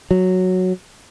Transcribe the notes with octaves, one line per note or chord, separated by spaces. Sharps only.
F#3